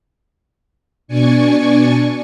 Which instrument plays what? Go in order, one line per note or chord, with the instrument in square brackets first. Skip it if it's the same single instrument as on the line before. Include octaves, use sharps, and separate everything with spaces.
[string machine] B2 D4 D5 G#5 C#6